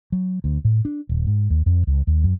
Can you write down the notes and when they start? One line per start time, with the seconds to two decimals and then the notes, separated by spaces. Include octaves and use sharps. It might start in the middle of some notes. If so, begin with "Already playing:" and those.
0.12 F#3
0.44 D2
0.65 A2
0.85 D4
1.09 D#1
1.27 G#2
1.50 D#2
1.66 F2
1.87 C#2
2.07 D#2
2.24 F#2